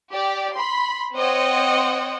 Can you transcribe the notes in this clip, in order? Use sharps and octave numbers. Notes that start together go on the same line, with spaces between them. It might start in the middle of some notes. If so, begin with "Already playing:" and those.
G4 D5
B5 C6
C4 C5 C#5 D#5 F#5 G5